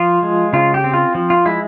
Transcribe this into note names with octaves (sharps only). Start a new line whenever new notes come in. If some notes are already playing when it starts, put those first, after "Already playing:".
Already playing: F3 F4
G#3
C#3 F4
G4
C4
F4
F3
F4
G#3 E4